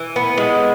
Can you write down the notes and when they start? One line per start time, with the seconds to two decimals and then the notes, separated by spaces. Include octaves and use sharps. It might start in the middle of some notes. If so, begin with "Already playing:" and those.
Already playing: E3
0.16 B3
0.38 G#3